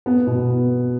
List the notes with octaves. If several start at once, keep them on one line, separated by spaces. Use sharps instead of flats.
B3
B2